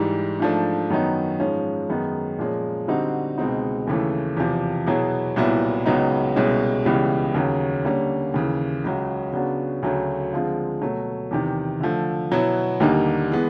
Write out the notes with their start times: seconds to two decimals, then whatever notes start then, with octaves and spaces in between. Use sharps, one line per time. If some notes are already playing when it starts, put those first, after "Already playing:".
Already playing: G#2 E3 G3
0.40 G#2 F3 A3 D4
0.90 F#2 D#3 F#3 B3 D#4
1.40 G#2 F3 G#3 C#4
1.90 F#2 D#3 G#3 B3 D#4
2.39 A#2 F3 G#3 C#4
2.88 D3 G3 C4 D#4 F#4
3.38 C#2 B2 G#3 C4 D#4
3.87 D#2 C#3 E3 A3
4.37 E2 C3 F3
4.86 B2 F#3 B3 E4 G#4
5.36 C2 A#2 F#3 B3 E4
5.86 C#2 C#3 F#3 B3 D#4
6.36 C2 B2 G#3 C#4
6.85 C#2 C#3 E3 G3 B3
7.34 D#2 C#3 F#3
7.85 D3 G3 A#3 C#4
8.34 D#2 C#3 E3
8.84 C#2 C#3 F#3
9.33 C#3 F#3 B3 D4 F#4
9.83 D2 C#3 F#3 A3
10.32 D3 F3 G#3 C4 F4
10.82 B2 F#3 A3
11.31 E2 C3 D#3
11.81 D3 F3 A3
12.31 B2 F#3 B3 E4
12.80 D#2 D3 G3 A#3 D#4
13.31 E3 G#3 B3